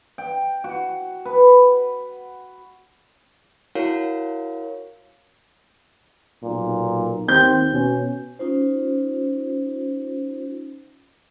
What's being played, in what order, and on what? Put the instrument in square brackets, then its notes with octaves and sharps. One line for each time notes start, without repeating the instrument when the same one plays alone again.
[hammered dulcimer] G5
F#4
B4
[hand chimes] E4 F#4 A#4 C#5 F5
[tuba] B1 [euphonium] A#2
[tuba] D#2 [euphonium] C4 [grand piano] G6
[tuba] B2 [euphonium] C#4
[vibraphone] C#4 D#4 F4 C5